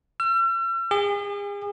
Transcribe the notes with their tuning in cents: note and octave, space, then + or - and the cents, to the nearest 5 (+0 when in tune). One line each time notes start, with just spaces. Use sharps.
E6 +45
G#4 -40